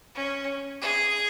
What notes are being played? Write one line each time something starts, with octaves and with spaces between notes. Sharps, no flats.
C#4
G#4